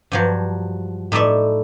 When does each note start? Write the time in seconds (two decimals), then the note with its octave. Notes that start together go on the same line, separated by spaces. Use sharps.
0.12 G2 F3 F#3
1.12 A2 D#4 A4 D5 E5